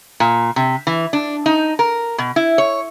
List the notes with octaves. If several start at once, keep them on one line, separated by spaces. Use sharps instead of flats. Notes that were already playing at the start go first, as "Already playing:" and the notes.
A#2
C3
E3
D4
D#4
A#4
B2
E4
C#5